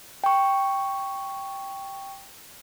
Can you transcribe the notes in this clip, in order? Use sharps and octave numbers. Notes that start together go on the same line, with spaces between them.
G5 C#6